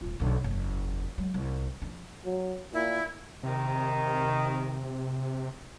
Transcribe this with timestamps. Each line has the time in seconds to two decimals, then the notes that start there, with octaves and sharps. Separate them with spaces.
0.01 D#1 F4
0.20 B1 D3
0.44 F#1 E2
1.18 F#3 G#3
1.34 C2
1.82 F3 D4
2.25 F#3
2.74 A#2 E4
3.43 C3 D#3